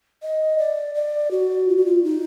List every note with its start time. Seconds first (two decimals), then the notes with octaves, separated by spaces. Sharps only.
0.23 D#5
0.58 D5
0.95 D5
1.31 F#4
1.68 F4
1.77 F#4
1.86 F4
2.04 D#4